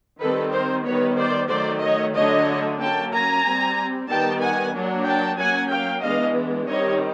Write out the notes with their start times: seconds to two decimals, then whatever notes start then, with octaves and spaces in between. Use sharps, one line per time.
0.20 D#3 G3 C4 A4 B4
0.52 A#4 C5
0.85 D#3 G3 B3 B4 C#5
1.17 C5 D5
1.49 D#3 F#3 A3 C5 D5
1.82 C#5 D#5
2.14 D3 F#3 A3 D4 C#5 D#5
2.79 F#3 A#3 C#4 G5 A5
3.12 G#5 A#5
3.44 G3 C4
4.08 D#3 G3 B3 G5 A5
4.41 F#5 G#5
4.73 F#3 A#3 D4
5.05 G5 A5
5.37 F#3 A#3 C#4 F#5 G#5
5.70 F5 G5
6.02 E3 G#3 B3 D4 D#5 F5
6.67 D#3 G3 C4 C#5 D#5